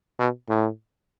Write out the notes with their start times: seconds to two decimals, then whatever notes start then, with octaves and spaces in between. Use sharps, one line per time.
0.19 B2
0.49 A2